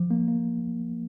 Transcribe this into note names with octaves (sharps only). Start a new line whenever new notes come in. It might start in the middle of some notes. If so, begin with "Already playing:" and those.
Already playing: F3
A#3
A#3